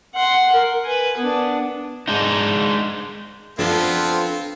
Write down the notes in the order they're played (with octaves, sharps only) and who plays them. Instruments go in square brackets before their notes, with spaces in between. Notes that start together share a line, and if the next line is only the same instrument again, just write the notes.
[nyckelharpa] F#5 C6
A#4
B4 G#5
B3 D4
[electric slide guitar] G#3 D4 D#4
[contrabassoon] F3 [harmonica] B3 C4 F4 [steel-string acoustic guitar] D4 A4 A#4